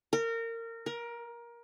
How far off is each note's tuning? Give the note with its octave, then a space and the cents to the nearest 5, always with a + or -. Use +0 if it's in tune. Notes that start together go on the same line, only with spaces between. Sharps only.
A#4 -25
A#4 +20